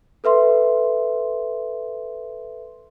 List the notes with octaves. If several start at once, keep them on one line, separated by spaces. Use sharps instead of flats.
A4 B4 E5 C6